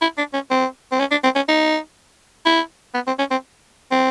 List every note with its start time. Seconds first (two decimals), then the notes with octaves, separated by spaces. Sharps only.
0.02 E4
0.18 D4
0.34 C#4
0.51 C4
0.92 C4
1.00 C#4
1.11 D4
1.24 C4
1.35 C#4
1.48 D#4
2.46 E4
2.94 B3
3.07 C4
3.19 C#4
3.31 C4
3.91 C4